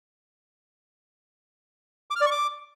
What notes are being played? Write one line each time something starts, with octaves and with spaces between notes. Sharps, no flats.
D6
F6
D5
C#6
D6